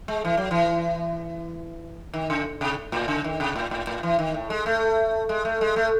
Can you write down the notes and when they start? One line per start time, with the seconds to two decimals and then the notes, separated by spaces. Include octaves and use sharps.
0.08 G#3
0.25 E3
0.37 F#3
0.51 E3
2.13 D#3
2.30 C#3
2.61 C3
2.92 A2
3.08 C#3
3.24 D#3
3.40 C3
3.56 A2
3.71 A2
3.87 A2
4.03 E3
4.19 D#3
4.34 A2
4.50 G#3
4.66 A3
5.29 G#3
5.45 A3
5.61 G#3
5.76 A3